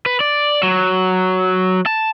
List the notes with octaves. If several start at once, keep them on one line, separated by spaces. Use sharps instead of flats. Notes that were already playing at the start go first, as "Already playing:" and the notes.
B4
D5
F#3
A5